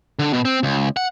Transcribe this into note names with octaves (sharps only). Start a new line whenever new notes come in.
D3
B2
C4
C#2
F#5